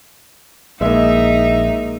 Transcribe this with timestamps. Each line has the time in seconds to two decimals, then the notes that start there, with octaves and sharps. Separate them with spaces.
0.81 A#1 G#3 A#3 D#4 E5